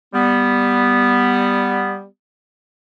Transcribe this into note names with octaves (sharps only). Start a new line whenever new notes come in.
G3 B3